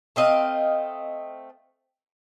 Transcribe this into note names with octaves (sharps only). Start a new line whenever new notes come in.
A3 C4 D#5 F5